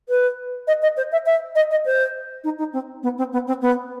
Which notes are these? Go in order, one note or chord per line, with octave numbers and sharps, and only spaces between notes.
B4
D#5
D#5
C5
E5
E5
D#5
D#5
C5
D#4
D#4
C4
B3
C4
B3
C4
B3